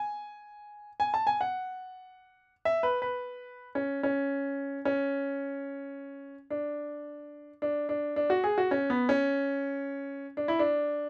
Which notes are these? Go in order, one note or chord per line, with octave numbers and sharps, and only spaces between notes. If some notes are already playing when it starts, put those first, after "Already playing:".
Already playing: G#5
G#5
A5
G#5
F#5
E5
B4
B4
C#4
C#4
C#4
D4
D4
D4
D4
F#4
G#4
F#4
C#4
B3
C#4
D4
E4
D4